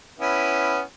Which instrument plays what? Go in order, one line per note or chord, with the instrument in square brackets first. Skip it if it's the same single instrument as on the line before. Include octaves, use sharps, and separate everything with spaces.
[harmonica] B3 C#4 E4